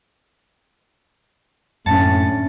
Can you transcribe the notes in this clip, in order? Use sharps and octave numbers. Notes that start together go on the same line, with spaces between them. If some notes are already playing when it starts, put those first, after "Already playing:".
F#2 A2 D3 C#4 A5 B6 C#7